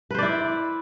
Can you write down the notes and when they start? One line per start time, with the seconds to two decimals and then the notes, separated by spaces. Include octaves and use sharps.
0.11 B4
0.15 C5
0.18 D5
0.22 E4